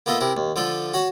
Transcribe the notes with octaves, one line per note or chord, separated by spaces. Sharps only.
A#3 B3 F4 A4 D#5 E5
C3 E4 A#4
D#2
D3 F3 F4 A4 D5
F#4 C#5 F#5 A5 C#6